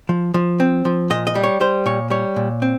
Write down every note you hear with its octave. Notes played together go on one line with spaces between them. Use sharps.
F3
F3
C4
F3
A#2 D#5
D#5
G3
C#5
G3 C5
A#2 C#5
G3 C#5
A#2
C4